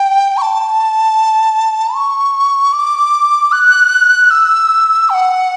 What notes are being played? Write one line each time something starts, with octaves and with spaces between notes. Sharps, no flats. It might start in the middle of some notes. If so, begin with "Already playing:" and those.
Already playing: G5
C#6
A5
C#6
D6
F#6
E6
G5
F#5